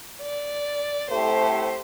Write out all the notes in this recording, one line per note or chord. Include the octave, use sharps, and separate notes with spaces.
D5
A2 C3 A3 G4 C5